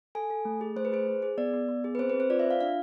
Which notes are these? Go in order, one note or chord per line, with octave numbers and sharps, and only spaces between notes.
A4 G#5
A4
A3
G#4
A3 C5
B4
G#4 C5
G#4
G#4
B3 D5
B3
B3
G#4
B4
C4 C5
B4
C4
C5
F4 D5
E5
F4 F5
D4 F5